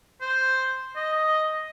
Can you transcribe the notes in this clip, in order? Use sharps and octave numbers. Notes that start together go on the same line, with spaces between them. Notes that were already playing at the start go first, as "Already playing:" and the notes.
C5
D#5